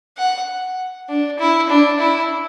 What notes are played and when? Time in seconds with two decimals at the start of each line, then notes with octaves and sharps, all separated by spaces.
0.18 F#5
1.09 D4
1.39 E4
1.70 D4
2.00 E4